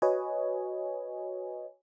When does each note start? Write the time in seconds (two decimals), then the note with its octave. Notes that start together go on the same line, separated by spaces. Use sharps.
0.02 F#4 B4 C#5 D#5 G#5